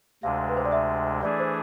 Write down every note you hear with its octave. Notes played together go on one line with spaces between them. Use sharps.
D2 C3 G#3 D4 F5
B4
C5
D5
E5
E3 A3 D4 G#4 D5
C5